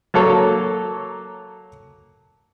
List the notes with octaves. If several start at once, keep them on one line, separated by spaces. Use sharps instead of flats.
F#3 A#3 A4 C#5